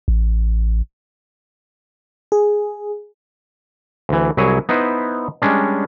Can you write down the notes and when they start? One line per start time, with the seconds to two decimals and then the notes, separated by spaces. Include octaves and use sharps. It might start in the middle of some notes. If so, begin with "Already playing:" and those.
0.08 A1
2.32 G#4
4.09 D2 E3
4.37 C2 F#3 E4 G#4 C#5 G#5
4.69 B3 D#4 E4 B4 C5
5.42 G3 G#3 C#4 D4